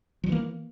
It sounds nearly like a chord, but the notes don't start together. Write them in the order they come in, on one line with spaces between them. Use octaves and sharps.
F3 G3 E3 A#3